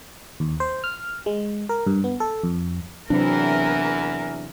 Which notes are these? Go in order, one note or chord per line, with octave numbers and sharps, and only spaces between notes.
D#2
C5
F6
G#3
A#4
G2
B3
A4
F2
E2 C3 E3 F#3 C4 D4 A#4